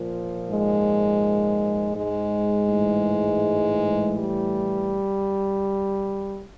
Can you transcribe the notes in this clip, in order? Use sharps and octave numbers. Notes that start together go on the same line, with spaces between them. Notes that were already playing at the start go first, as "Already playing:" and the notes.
Already playing: A#2 F3
G#2 G#3
G#2 G#3
A2 E3
G3